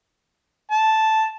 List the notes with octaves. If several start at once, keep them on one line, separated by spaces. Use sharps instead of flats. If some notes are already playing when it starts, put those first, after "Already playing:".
A5